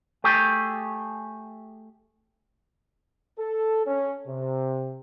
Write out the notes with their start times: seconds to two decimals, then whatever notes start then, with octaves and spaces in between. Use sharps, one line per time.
0.24 A3 G4 G#4
3.39 A4
3.85 C#4
4.27 C3